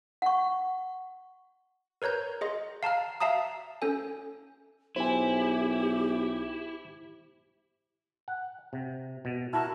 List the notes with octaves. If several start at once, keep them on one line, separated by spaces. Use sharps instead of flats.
F#5 C#6
A#4 B4 C#5 A#5 G6
G#4 D#5 C6
F5 A5 A#5 F6
E5 F5 A5 A#5 D#6
C#4 A4 G#5
B1 E4 G4 C5 G#5
F#5
C3
B2
E4 F#4 A#4 A5